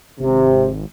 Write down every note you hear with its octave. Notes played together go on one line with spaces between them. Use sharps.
G#1 C3